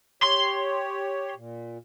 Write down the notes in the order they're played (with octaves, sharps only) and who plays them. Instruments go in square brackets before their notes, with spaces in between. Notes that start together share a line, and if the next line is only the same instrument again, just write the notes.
[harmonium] G4 C#5 [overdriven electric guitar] C6
[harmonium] A#2